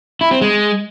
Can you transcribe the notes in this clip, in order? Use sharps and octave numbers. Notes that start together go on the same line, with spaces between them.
E4
C4
G#3